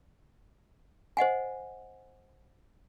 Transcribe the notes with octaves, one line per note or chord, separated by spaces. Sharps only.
C5 D#5 F#5 G#5